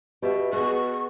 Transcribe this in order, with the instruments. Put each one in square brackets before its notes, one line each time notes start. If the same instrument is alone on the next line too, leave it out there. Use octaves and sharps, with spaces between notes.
[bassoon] B2 [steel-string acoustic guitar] G4 B4 E5
[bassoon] B2 [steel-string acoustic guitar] B3 G#4 [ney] C#6